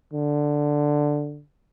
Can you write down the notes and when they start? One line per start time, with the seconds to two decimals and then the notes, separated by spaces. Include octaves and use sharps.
0.13 D3